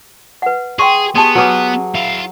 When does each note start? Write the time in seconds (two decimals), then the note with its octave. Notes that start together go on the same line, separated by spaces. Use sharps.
0.42 B4 F#5
0.79 G#4 G5 C6 C#6
1.15 B3 G4 G#4 A5 C6
1.35 F#3 F#4 G#4 B4 D6
1.95 E4 F5